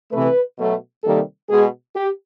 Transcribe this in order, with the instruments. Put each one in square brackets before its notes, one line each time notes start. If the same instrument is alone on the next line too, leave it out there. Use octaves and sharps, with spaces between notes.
[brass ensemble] C3 E3 A3 B4
B2 F#3 A3
C3 D#3 G3 A#3 A4
B2 G#3 G#4
G4